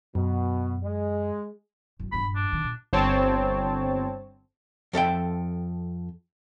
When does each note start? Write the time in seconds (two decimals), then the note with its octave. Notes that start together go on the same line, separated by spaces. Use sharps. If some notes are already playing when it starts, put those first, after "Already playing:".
0.15 F#2 B2
0.83 G#3
2.00 F#1
2.12 D#1 G2 B5
2.36 D4
2.51 A#2 D#3
2.64 A#2
2.93 G1 C4 C#5 A5
4.93 F2 A4 E5 G5